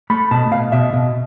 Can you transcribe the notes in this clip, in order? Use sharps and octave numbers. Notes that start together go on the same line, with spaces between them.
A3 B5
B2 A5
B2 F5
B2 E5
B2